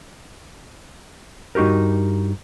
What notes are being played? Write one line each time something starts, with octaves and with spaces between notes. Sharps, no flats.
G2 D#4 F#4 G4 A#4